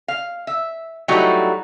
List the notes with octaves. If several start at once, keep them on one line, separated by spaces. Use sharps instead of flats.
F5
E5
F#3 G3 A3 D#4 E4 F#4